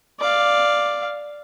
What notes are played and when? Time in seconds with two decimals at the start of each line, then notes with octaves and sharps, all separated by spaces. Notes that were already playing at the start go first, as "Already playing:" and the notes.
0.20 D5 F5